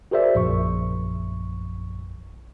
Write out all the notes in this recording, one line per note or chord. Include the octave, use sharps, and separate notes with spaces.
F#4 G#4 A#4 C5 D5 E5
A#1 F#2 C#6